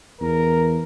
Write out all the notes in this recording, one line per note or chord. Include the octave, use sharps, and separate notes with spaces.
E2 A#4